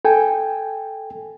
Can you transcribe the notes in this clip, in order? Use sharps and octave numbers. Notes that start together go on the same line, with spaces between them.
A4 G5 G#5